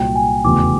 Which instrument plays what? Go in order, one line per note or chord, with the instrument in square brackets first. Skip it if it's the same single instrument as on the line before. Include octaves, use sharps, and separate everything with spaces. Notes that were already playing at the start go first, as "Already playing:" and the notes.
Already playing: [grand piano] C2 A#2 F#3 [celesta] G5
[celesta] G#5
[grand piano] F1 E2 C#3 F#3 A3 [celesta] D6